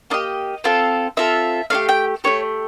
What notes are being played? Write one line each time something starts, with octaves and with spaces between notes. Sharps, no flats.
A#3 D4 G4 D#5
C4 F4 A4
C4 F4 A4 E5
A3 D4 G4 F5
G5
A3 D4 G4 C#5